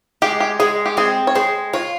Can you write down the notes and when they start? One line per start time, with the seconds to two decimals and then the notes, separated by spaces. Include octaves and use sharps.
0.22 G#3 G4
0.40 G4
0.60 G#3 G#4
0.86 G4
0.97 C4 G#4
1.27 C#5
1.35 G#3 C5
1.73 F4 C#5